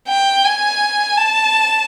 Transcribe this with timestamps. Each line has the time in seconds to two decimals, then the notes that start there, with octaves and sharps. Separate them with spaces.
0.08 G5
0.45 G#5
1.17 A5